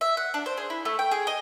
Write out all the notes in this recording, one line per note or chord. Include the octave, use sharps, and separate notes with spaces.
E5
F#5
D4
C5
G#4
E4
A3
G5
G#4
D#5